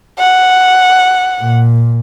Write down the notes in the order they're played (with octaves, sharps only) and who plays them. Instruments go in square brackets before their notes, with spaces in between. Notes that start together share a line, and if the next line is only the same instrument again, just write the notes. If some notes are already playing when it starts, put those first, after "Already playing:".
[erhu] F#5
[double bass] A#2